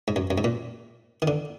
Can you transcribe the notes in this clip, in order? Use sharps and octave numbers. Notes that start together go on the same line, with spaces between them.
G#2
F#2
F#2
G#2
A#2
D#3
D3